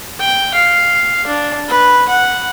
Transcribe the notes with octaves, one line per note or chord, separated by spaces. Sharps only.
G5
F5
D4
B4
F#5